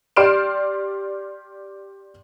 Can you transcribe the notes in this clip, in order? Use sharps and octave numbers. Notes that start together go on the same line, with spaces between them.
G4 D5 C6 F6 D7 E7